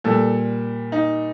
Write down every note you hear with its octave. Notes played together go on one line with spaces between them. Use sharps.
A#2 G3 A4
D#4